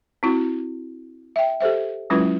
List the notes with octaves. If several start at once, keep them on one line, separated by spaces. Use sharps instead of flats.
C4 E4 F#4
E5 G5
G4 A4 C5 E5
F#3 G#3 C#4 E4 F4 B4